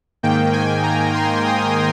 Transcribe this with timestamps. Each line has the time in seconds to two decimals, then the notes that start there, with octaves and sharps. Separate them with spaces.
0.23 G#2 D#3 A#3 G5
0.53 G#5
0.83 A#5
1.14 C6
1.44 D#6